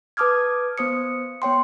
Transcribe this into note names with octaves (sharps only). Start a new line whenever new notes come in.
B4 A5 D6 D#6 F6 G#6
B3 C5 D#6 C#7
B3 C#5 G5 C6